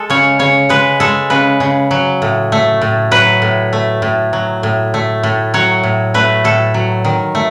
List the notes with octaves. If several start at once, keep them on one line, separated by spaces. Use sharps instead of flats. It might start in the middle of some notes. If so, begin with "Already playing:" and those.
Already playing: G#3 A4
C#3 C#5
C#3 C#5
G#3 B4
G#3 A4
C#3 B4
C#3
F#3
A2
A3
A2
F#3 B4
A2
A3
A2
F#3
A2
A3
A2
F#3 C#5
A2
A3 B4
A2 A4
F#3
D#3
A3